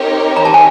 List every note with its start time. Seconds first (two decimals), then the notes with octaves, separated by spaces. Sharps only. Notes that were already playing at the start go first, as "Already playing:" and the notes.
Already playing: C4 D#4 G4 A#4 C#5
0.37 A#5
0.45 A5
0.54 G#5